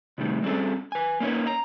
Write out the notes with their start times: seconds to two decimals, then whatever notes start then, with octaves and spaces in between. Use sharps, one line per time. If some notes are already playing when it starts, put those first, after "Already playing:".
0.18 C3 D#3 G3 A3
0.43 G3 C4 C#4 G#4 A4
0.92 B4 G#5
1.20 A#3 C#4 D#4 B4 C#5
1.47 A#5